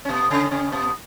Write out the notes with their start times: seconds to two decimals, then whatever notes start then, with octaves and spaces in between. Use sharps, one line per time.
0.05 C#4
0.09 B2 B3
0.30 C#3 C#4
0.51 C#3 C#4
0.72 B2 B3